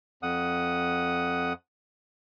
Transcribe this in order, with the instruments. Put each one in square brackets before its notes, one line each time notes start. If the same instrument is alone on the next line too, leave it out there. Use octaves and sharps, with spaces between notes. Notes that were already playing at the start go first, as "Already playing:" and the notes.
[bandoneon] F2 F#5 D#6